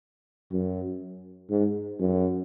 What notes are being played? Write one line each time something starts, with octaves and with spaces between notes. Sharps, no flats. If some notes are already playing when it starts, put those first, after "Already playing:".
F#2
G#2
F#2